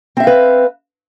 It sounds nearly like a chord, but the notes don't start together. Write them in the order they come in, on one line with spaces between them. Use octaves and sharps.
C4 E5 F5 B4